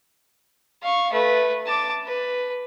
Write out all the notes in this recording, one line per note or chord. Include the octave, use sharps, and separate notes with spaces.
F5 C#6
A3 B4
A5 D6
B4